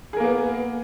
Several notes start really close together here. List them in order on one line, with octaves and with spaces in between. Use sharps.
G#4 A#4 A#3 B3